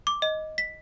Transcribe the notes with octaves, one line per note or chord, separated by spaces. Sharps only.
D6
D#5
B6